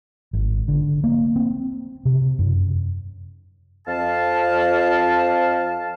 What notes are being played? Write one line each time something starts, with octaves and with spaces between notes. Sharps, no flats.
G#1
D3
A#3
C4
C3
F#2
F2 F5 A5